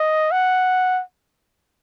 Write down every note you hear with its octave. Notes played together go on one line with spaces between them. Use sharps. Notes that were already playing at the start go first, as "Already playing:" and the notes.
Already playing: D#5
F#5